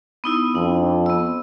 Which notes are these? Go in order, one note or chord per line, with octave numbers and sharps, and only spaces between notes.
B3 D#4 E4
F2 D4
B3 E6